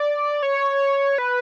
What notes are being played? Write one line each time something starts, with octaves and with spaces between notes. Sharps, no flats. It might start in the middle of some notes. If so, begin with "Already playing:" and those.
Already playing: D5
C#5
B4